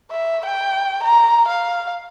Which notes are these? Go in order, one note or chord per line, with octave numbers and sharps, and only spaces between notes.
E5
G5
A#5
F5